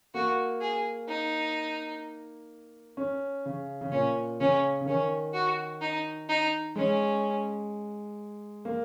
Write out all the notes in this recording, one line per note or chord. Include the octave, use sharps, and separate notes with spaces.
A#3 F#4
G#4
D#4
C#4
C#3
C#3
A#2 C#4
C#3 C#4
C#3
D#3 C#4
F#4
D#4
D#4
G#3 C#4
A#3